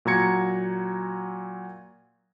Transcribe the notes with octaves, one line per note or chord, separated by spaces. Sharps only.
A#2 F#3 F#4 A#5 G#6 C#7